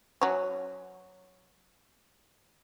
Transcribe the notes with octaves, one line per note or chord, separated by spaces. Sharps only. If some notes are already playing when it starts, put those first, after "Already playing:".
F#3 C#4